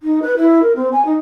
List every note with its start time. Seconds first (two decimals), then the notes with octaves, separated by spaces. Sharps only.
0.03 D#4
0.22 B4
0.37 E4
0.62 A#4
0.76 C4
0.92 G#5
1.05 D#4